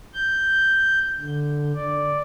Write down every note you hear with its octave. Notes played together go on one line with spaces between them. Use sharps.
G6
D3
D5